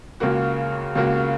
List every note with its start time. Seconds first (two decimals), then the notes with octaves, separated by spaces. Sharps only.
0.20 C#2 C#3 A#3 F#4
0.95 C#2 C#3 A#3 F#4